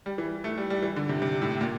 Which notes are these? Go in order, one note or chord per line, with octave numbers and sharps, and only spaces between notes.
G3
E3
A3
G3
G3
E3
D3
C3
C3
A2
A#2